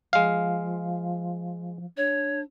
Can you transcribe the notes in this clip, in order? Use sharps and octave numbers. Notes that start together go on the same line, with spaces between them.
F3 G#3 F5
D4 C#5